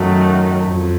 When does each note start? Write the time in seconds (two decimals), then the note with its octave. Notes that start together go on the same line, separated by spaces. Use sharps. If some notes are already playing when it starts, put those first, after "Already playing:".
Already playing: F#2 D#3 F#3 A3
0.69 F2